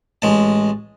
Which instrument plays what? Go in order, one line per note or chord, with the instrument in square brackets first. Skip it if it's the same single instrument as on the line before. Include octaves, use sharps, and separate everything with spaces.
[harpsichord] A1 G#3 A5